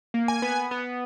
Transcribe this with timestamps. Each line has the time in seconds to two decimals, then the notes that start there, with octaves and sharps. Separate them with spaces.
0.14 A#3
0.28 G#5
0.42 B3
0.71 B3